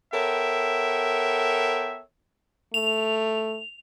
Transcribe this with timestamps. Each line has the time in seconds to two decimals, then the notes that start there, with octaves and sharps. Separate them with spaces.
0.13 B3 A4 A#4 C#5 E5 G5
2.74 A3 F7